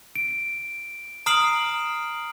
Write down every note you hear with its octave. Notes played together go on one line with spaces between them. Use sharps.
D7
A#5 D#6 F6 C7 D7 F#7